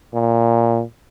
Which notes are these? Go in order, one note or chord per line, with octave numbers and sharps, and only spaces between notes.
A#2